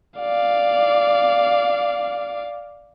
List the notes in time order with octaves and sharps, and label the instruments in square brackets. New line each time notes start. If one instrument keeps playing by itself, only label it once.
[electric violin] D5 F5